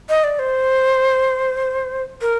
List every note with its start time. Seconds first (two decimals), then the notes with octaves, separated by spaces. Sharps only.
0.09 D#5
0.24 D5
0.39 C5
2.21 A#4